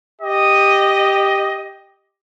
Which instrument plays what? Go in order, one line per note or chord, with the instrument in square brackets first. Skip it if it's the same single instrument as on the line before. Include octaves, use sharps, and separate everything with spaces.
[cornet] G4 [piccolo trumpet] D#5